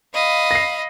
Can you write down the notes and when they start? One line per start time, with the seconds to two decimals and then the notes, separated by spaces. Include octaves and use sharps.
0.14 D#5 F5 B5
0.51 A#6 C7